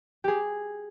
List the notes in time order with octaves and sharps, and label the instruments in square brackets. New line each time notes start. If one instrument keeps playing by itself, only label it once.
[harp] G4 G#4